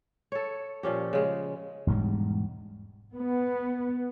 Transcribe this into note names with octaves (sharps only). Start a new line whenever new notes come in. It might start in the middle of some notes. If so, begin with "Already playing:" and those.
A4 C#5
A#2 F3 C#4 G4
C#3 G#3
E1 G#2 G3 G#3
B3